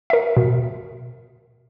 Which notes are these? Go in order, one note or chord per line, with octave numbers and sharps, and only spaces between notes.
A#4 E5
B2